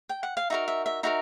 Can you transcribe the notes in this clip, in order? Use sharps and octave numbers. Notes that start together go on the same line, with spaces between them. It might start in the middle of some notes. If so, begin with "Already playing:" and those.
G5
F#5
F5
D#4 F#4 A#4 E5
E5
E5
D#4 F#4 A#4 E5